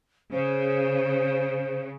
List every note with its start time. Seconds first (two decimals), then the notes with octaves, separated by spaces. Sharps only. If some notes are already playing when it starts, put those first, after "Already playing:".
0.31 C#3 C5